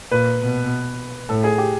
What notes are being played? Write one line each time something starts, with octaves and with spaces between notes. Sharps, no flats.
A#2 B4
B2
A2 A4
G#4
G4